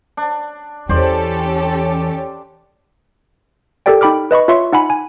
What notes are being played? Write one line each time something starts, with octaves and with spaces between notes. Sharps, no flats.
D4
E2 E3 C#4 G4 A4 C5 D5
G4 A4 A#4 D5 G5
D#4 G5 B5 D6 F6
B4 D#5 B5 C#6
F4 C#5 E5 C6 C#6
D#4 F#5 G#5 B5
G#5